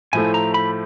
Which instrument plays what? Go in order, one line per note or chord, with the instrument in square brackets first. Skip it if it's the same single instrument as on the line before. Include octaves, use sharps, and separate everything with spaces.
[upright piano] A2 F3 A3 [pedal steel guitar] G#5
[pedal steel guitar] A#5
B5